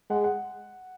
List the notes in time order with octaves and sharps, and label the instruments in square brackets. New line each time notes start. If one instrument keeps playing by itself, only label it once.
[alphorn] G#3 [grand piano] F#5
[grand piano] F#5